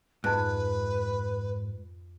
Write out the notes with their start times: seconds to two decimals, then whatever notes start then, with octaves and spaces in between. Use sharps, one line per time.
0.24 F2 G#2 B4 F#6